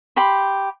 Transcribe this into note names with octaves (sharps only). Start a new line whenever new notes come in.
G4 B5 C6